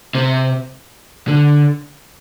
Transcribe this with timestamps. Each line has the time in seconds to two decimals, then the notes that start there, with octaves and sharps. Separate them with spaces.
0.15 C3
1.28 D3